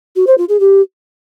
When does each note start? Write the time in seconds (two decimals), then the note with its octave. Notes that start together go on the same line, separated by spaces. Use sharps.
0.16 F#4
0.27 C5
0.38 F4
0.49 G#4
0.60 G4